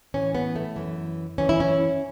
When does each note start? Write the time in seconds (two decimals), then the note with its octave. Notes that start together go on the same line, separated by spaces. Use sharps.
0.14 A2 E3 C#4
0.35 B3
0.56 A3
0.76 F#2 E3
1.38 F#2 E3 C#4
1.49 E4
1.60 C#4